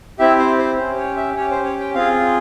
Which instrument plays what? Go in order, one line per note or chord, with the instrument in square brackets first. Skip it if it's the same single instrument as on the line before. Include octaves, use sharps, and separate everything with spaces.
[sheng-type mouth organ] C4 E4 G4 E5
C5
C5
C#4 G4 C5
C#5
E5
C#4 G4 C#5
C5
C#5
G5
C4 F4 G#4 F5